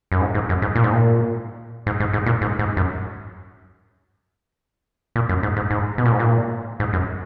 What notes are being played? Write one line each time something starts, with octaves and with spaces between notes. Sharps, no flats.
F#2
G#2
G#2
F#2
G#2
A#2
G#2
A#2
G#2
G#2
G#2
A#2
G#2
G#2
F#2
A#2
F#2
G#2
G#2
G#2
B2
A#2
G#2
A#2
G#2
F#2